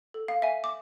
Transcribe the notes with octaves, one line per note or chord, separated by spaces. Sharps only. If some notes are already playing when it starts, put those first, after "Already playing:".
A4
F5
E5 G#5
D6